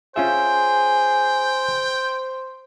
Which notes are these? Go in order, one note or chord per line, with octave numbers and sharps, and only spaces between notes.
C#4 F4 G#4 C5 E5 G5